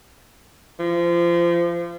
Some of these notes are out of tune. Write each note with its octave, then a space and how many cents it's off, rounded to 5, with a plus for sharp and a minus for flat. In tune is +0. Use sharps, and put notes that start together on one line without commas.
F3 -25